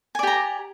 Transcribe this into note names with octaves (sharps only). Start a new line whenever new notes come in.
G4 D5 G#5 A#5